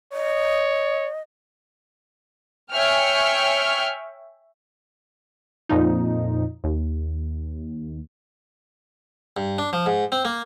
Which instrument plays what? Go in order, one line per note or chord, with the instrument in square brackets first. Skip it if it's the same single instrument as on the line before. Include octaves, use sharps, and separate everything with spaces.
[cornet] C#5 [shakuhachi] D#5
[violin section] C#5 E5 G5 G#5 F6
[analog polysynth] F2 A#2 F3 D#4
D#2
[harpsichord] G2
D4
F3
G#2
C4
A#3